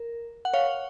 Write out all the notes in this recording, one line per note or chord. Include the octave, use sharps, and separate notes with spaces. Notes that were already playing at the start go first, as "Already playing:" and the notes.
Already playing: A#4
F#5
C#5 F5